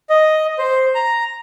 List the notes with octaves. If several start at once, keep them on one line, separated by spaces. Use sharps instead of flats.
D#5
C5
A#5